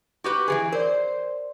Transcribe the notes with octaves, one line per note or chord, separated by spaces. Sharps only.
F#4 G4 B4
E3 F3 G#4
A#4 C5 D5